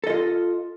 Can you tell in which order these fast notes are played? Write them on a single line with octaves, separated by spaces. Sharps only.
A4 D#5 F4